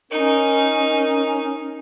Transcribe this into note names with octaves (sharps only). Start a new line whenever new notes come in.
C#4 D#4 A#4